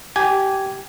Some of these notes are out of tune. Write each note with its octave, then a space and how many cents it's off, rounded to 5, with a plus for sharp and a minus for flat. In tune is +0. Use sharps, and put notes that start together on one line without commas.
G4 -20 G#5 +0